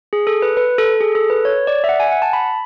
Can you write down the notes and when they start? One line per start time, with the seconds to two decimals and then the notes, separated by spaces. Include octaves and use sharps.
0.13 G#4
0.27 A4
0.42 B4
0.57 B4
0.78 A4
1.01 G#4
1.15 A4
1.30 B4
1.45 C#5
1.67 D5
1.84 E5
1.89 F#5
2.00 G#5
2.12 F#5
2.22 A5
2.33 B5